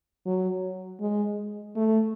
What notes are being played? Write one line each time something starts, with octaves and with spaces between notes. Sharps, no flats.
F#3
G#3
A3